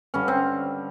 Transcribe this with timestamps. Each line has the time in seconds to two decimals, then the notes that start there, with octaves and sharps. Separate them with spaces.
0.14 G2 D3 G3 C#4
0.28 C4